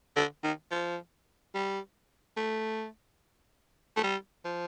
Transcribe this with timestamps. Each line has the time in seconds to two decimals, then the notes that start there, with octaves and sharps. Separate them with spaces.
0.16 D3
0.44 D#3
0.71 F3
1.55 G3
2.37 A3
3.97 A3
4.03 G3
4.45 F3